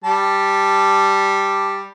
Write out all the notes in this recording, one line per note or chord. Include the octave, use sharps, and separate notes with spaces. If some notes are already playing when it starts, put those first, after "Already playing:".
G3 A5